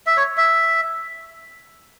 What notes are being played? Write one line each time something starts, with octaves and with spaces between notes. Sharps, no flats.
E5
C#5
E5